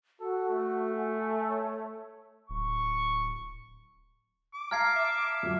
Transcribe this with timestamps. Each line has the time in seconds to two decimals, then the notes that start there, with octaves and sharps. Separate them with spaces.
0.20 F#4 A4
0.49 A3
0.97 G#5
1.49 C#5
2.50 D1 C#6
4.54 D6
4.71 F5 A5 A#5 F6 G#6 C7
4.96 E5
5.43 F2 F#3